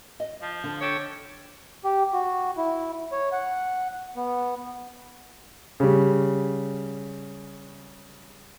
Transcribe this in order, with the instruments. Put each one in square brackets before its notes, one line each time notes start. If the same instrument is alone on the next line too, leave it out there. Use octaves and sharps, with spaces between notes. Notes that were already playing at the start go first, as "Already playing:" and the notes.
[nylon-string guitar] D#5
[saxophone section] F3
[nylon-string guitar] D3
[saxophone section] G4 A4 C#5
[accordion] G4
F#4
E4
C#5
F#5
B3
[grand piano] C#3 G3